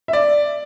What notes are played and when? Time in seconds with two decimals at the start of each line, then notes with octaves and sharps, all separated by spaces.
0.08 E5
0.13 D5